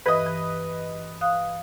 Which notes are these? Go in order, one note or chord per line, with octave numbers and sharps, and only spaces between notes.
G2 E3 B4 D#5
E3
F5 D#6 F#6